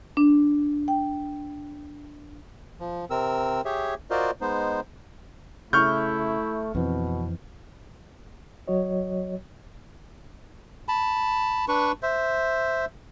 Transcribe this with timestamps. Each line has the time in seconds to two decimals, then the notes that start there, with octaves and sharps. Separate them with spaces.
0.17 D4
0.88 G5
2.80 F3
3.10 C3 C4 A#4 E6
3.65 G4 G#4 C#5 E5
4.10 F4 F#4 A#4 C5 D5 D#5
4.41 G#3 B3 D#4 C5
5.73 C#3 A3 E4 C#6 F6 G6
6.75 F2 B2 E3 C4
8.68 F#3 F#4 C#5 D#5
10.88 A5 B5
11.68 D4 B4 C#6
12.03 C5 E5